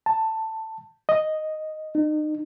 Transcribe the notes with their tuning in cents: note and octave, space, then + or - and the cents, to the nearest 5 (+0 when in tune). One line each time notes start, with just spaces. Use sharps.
A5 +10
D#5 +0
D#4 -35